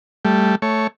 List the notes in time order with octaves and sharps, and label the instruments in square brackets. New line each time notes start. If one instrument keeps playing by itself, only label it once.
[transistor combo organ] G3 A3
A3 C#5